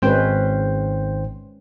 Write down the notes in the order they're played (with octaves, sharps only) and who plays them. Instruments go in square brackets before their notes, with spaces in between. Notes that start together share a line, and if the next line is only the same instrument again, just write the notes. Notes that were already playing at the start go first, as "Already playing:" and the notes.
[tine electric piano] G#1 C5 G5 [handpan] G#3 C#4 B4